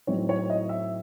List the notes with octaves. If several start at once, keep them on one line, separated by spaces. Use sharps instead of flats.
A2 F#3 C4 D#4 C#5
C#5
D#5
E5